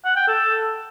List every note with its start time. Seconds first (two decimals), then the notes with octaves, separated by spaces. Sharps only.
0.04 F#5
0.16 G5
0.28 A4